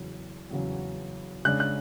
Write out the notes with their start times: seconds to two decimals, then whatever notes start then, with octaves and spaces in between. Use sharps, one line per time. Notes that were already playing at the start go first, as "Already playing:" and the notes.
Already playing: E2 C#3 F#3
0.51 E2 C#3 F#3
1.45 C#3 G#3 D4 F#6
1.60 F#6